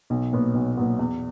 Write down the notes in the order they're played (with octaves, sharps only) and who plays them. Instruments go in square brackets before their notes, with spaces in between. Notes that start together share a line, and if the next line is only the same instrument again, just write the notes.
[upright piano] B1
A#2 F#3 B3 F#4
B1
A#2 F#3 B3 F#4
E2